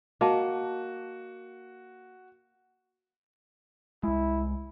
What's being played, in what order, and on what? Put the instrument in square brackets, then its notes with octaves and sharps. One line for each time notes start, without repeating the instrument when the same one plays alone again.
[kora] A#3 [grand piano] F#4 [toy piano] D#5 A5
[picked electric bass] C2 G#3 [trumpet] E4